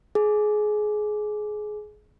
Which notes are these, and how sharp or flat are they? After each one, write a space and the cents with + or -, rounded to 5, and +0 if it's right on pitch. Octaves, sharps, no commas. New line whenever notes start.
G#4 +25